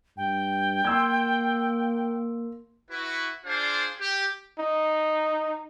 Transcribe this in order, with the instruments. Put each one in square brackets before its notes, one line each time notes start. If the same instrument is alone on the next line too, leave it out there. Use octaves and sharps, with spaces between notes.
[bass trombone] G2 [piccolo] G5
[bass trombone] A#3 [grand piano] C6 E6 G#6
[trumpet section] E4 F#4 B4
D4 F4 G#4 C5 D5 F5
G4
[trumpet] D#4